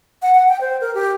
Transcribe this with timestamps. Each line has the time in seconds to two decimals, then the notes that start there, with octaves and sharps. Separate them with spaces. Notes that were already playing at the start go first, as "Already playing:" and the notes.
0.22 F#5
0.35 F#5
0.48 G5
0.61 C5
0.81 A#4
0.94 G4